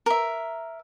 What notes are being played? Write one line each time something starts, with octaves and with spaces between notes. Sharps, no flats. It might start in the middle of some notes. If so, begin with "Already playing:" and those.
A#4 E5